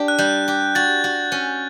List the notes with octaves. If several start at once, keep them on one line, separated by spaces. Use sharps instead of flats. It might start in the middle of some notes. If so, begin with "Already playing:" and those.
Already playing: D4 G4
F#6
G3 G6
G4
F#4 A6
F#4
C#4